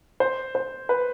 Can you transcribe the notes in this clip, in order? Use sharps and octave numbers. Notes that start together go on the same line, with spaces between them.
C5
C5
B4